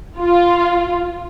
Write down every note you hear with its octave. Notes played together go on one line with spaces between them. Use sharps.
F4